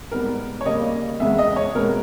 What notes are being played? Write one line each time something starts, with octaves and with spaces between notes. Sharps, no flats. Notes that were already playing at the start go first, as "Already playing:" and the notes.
G#2 G3 B3 A#4
C#5
C#3 G3 A#3 D#5
E2 C#3 G#3 B3 E5
D#5
C#5
B2 G#3 B3 A#4